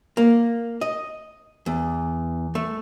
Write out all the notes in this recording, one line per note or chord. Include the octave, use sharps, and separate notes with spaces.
A#3
D#5
E2
A3